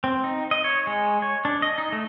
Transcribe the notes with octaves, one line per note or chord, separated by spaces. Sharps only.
C4
D#4
D#5
C#5
G#3
C#5
D4
D#5
D#4
A3